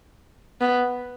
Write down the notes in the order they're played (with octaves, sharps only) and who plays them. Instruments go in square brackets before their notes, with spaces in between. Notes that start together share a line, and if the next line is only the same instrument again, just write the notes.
[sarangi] B3